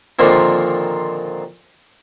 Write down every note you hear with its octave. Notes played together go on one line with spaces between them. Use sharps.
A#2 D3 D#3 F3 A#3 C4